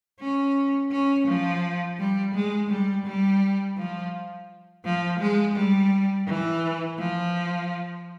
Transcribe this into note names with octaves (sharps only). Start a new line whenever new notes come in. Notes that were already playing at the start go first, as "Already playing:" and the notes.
C#4
C#4
F3
G3
G#3
G3
G3
F3
F3
G#3
G3
E3
F3